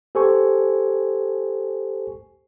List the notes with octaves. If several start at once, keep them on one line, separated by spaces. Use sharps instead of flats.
G4 A4 C5 G#5 C#6